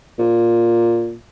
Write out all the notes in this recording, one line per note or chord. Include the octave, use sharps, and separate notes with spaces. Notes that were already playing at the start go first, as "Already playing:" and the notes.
A#2